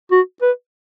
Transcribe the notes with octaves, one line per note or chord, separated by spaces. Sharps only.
F#4
B4